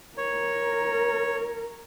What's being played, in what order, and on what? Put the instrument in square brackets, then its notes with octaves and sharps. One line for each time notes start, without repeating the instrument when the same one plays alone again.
[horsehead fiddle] A#4 [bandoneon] C#5